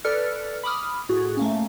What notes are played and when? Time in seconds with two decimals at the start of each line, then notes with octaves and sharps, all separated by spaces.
0.05 A4 B4 D5 F6 C#7
0.63 B5 D6 D#6 F6
1.09 A2 F#4 G#4
1.37 A3 A#3 C#4